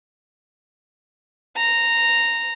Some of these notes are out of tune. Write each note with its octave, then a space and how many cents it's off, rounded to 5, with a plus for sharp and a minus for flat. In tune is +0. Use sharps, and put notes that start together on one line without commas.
A#5 -10